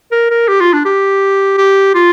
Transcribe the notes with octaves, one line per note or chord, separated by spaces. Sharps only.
A#4
A#4
G4
F4
D4
G4
G4
F4